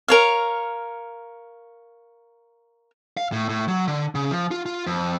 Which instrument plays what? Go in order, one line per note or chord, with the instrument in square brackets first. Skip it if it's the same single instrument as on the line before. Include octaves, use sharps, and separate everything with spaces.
[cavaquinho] A#4 C#5 F5
[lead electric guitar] F5
A2
A2
F#3
D3
C#3
F3
F4
F4
F2